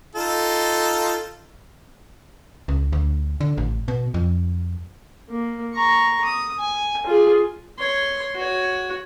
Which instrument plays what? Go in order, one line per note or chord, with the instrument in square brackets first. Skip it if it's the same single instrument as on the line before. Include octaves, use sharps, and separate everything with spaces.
[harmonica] D#4 F4 A4
[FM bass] C#2
D2
D3
A1
B2
F2
[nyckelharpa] A#3
A#5 C#6
D#6
G#5
F4 G#4
C#5 C6
F#4 C#5